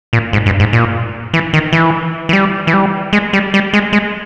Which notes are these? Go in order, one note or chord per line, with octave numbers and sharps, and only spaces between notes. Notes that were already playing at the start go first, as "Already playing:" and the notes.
A#2
G#2
G2
G#2
A#2
E3
D#3
E3
E3
G3
E3
G3
G#3
G3
G3
G#3
G#3